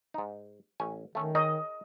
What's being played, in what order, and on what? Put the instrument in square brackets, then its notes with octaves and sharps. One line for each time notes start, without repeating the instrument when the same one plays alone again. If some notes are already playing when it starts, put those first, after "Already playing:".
[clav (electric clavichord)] G#2 D#4
A1 C#4 G#5
[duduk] D#3 [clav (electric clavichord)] A3 C#4
[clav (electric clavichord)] A#4 C#5 G5 [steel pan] D#5